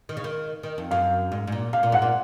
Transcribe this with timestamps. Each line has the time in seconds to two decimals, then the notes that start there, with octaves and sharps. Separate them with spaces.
0.09 D#3
0.17 C#3
0.24 D#3
0.63 D#3
0.78 F2
0.91 F#2 F5
1.32 G#2
1.48 G#2
1.52 A#2
1.73 C3 F5
1.83 A#2
1.92 G#2 F#5
2.02 A#2